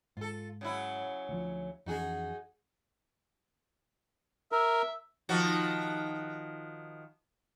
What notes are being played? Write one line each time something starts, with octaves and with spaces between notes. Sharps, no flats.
G#2 F4 A4
C#3 F#3 E4
D2 F3
F2 E3 C#4 D#4 F#4 G#4
A#4 E5
D#3 F3 F#4